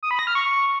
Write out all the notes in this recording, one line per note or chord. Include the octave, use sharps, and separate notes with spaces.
D#6
B5
A#6
F6
C#6